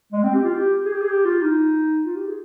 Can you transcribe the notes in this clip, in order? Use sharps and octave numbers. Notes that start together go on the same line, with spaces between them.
G#3
C4
G4
F4
G4
G#4
G4
G#4
G4
F4
D#4
F4
G4
G#4